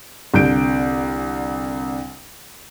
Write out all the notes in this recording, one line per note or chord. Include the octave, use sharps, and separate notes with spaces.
C2 D3 G6 D7